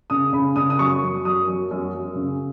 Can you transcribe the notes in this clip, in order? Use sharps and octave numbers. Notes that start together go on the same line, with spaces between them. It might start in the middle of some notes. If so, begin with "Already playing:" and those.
C#3 D#6
C#3 B5
C#3 D#6
D#6
F#2 C#6
F#2
F#2 D#6
F#2
F#2
F#2
C#3